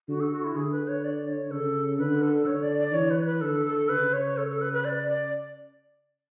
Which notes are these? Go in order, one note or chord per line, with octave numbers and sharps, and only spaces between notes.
D3 F#4
A4
F#4
E4
D3 G#4
B4
C#5
D5
C#5
C#3 A4
D3 B4
A4
D3 C#5
D5
D5
E3 C#5
B4
B4
D3 A4
A4
C#3 B4
C#5
A4
A4
B4
B4
D5
D5